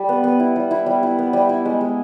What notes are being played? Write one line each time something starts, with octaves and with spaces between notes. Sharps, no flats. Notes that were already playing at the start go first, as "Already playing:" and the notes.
Already playing: G3
B3
B3
E4
G3
E4
G3
E4
B3
G3
E4
G#3
G#3